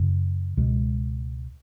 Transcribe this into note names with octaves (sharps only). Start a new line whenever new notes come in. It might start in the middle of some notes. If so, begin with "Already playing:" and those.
Already playing: F#2 C#3
C#2 B2 G#3